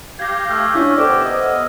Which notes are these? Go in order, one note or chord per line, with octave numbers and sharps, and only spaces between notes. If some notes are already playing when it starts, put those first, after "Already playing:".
G4 F5 G6 G#6 A#6
A3 E6 F6
C#4 D4 E4
C3 B3 G4 A4 C5 D5
D#5